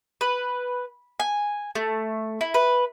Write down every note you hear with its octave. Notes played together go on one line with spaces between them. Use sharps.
B4
G#5
A3
E4
B4